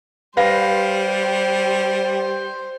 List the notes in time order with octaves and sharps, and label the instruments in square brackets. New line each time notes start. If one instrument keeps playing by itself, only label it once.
[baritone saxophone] G3 [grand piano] B4 F5 A#6 [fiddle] C5